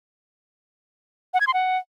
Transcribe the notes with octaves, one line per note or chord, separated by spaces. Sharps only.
F#5
G#6
C6
F#5